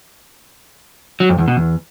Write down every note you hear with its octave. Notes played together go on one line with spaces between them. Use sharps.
F#3
F2
E2
B2
E2